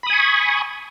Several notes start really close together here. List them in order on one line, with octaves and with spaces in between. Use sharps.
B5 D#6 G#5 C#6